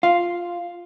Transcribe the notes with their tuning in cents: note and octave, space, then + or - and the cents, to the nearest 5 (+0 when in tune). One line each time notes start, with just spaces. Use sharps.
F4 +0 F5 +0